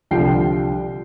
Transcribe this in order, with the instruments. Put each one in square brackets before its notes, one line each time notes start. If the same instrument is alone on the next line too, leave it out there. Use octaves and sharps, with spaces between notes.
[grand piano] C2 D3 F3 G3 G5 C7